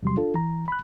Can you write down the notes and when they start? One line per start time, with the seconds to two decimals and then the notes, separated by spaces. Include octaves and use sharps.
0.03 E2 C3 F#3 G3 C6
0.17 D4 F4 A4
0.34 E3 A#5
0.68 B5 F#6